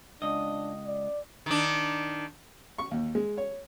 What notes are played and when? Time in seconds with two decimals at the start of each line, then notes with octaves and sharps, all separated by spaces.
0.22 C#2 D4 D#5
0.86 D5
1.46 D#3 D4
2.78 C#6
2.91 D#2
3.15 G#3
3.38 C#5